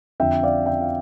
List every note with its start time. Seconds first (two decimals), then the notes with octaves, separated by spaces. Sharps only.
0.20 F2 D3 F3 E5 G5
0.43 D5 F5
0.66 E5 G5
0.81 F5